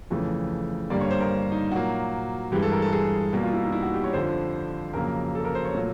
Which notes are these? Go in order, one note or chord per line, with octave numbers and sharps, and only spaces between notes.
F2 C#3 E3 A3
G2 D3 G3 A#3 D5
C#5
C5
A#4
D#4
A#2 F#3 A#3 F#4
G2 E3 G#3 G4
A4
A#4
A4
G#4
B2 G3 A#3 G4
F4
E4
D#4
E4
F#4
G4
C#5
F2 D3 F3 C5
F2 C#3 F#3 A#3 A#4
A4
A#4
C5
C#5
A#2 F#3 A3